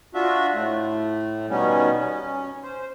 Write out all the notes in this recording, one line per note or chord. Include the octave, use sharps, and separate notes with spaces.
D4 F4 F#4 E5
A2 A3
B2 D#3 G3 B3 C#4
C#4
C5